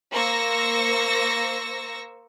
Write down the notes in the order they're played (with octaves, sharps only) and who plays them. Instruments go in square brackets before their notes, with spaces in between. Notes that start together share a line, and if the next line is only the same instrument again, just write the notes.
[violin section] A#3 C5 C#6 E6 A#6